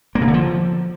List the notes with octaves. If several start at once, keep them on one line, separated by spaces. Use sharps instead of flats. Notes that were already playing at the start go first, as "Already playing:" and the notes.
A#3
C#3
D3
F3